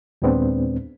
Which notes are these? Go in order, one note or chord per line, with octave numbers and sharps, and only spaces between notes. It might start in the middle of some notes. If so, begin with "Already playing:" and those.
D#2 A#2 G#3 B3 C4 D4